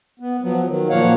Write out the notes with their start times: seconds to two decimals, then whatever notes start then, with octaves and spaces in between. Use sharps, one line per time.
0.20 B3
0.42 F3 F#3 B3
0.66 D#3 F#3
0.90 A#2 F3 A#3 C#5 F5 F#5